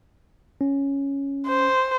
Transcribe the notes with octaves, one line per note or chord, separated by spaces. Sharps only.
C#4
C5